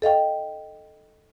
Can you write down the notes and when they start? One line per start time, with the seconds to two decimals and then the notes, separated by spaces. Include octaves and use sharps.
0.02 A4 D#5 F5 G5